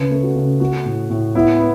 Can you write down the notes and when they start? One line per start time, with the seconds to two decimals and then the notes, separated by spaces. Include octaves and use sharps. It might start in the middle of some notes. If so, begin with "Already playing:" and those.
Already playing: C#3 B4
0.11 A3
0.23 F#4
0.36 C#3
0.60 A3 F#4
0.85 A2
1.10 A2
1.35 B3 E4
1.60 B3